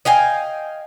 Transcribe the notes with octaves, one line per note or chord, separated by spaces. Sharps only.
D#5 F5 G5 G#5